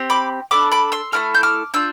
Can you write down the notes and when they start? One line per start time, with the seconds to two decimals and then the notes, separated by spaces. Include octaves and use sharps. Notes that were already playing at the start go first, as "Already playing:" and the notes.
Already playing: C4 G4
0.10 B5 D6
0.51 D4 A4 B5 D6
0.72 B5 D6
0.92 C6 E6
1.12 A3 C4 E4 A4 F6
1.35 G6
1.43 D6 F6
1.74 D4 F4 E6 G6